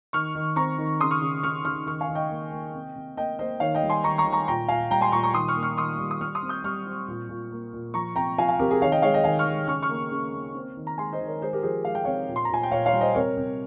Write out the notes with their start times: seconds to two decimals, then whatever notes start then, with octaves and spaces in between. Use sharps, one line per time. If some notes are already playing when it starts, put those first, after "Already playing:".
0.13 D#3 C#6 F6
0.35 D#3
0.56 C4 A#5 C#6
0.78 D#3
1.00 C#3 C6 D#6
1.11 C#6 F6
1.22 C#3
1.43 C#3 C#6 F6
1.65 C#3 C#6 F6
1.86 D#3 C#6 F6
2.01 F5 G#5
2.08 D#3
2.15 D#5 G5
2.30 A#3
2.51 A#3
2.74 C3
2.96 C3
3.17 A#3 D#5 G5
3.39 A#3 C5 D#5
3.60 D#3 C#5 F5
3.75 D#5 G5
3.83 G3
3.89 G#5 C6
4.04 D#3 A#5 C#6
4.18 A#5 C#6
4.25 D#3
4.33 A#5 C#6
4.48 A#2 G5 A#5
4.68 A#2 F5 G#5
4.91 G3 G5 A#5
5.01 G#5 C6
5.12 A#2 A#5 C#6
5.23 A#5 C#6
5.34 D#3 C6 D#6
5.48 C#6 F6
5.56 A#3
5.63 C#6 F6
5.77 D#3 C6 D#6
5.99 G3
6.11 D#6
6.21 G3 C#6 F6
6.35 C6 D#6
6.43 C4
6.49 D#6 G6
6.64 G3 C#6 F6
6.86 C4
7.08 A#2
7.29 A#2
7.52 A#3
7.73 A#2
7.94 F3 A#5 C#6
8.16 C3 G5 A#5
8.38 F3 F5 G#5
8.49 F5 G#5
8.59 C3 G4 A#4
8.71 G#4
8.82 D#3 C#5 F5
8.92 D#5 G5
9.02 G#3 C#5 F5
9.14 D#5 G5
9.24 D#3 F5 G#5
9.39 C#6 F6
9.47 G#3
9.67 C#3 C#6 F6
9.82 C#6 F6
9.89 A#3
10.11 C#3
10.34 A#3
10.55 C4
10.77 D#3
10.87 A#5
10.98 G#3 G#5 C6
11.12 C5 D#5
11.20 D#3
11.27 A#4 C#5
11.41 G#3 G#4 C5
11.53 G4 A#4
11.63 F3 G#4 C5
11.85 G#3 F5
11.95 G5
12.04 C3 C#5 F5
12.29 A#2
12.36 C6
12.45 A#5
12.50 A#2 G#5
12.63 G5
12.71 A#2 C#5 F5
12.86 C#5 F5
12.93 G3
13.01 C5 D#5
13.15 C3 A#4 C#5
13.37 C3